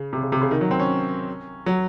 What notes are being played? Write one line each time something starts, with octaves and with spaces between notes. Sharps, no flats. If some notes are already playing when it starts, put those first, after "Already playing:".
Already playing: C#3
C3
C#3
C3
C#3
D#3
F#3
C4
C#4
F#3